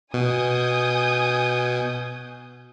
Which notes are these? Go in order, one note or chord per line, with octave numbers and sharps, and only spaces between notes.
B2 G#5 D#6 G6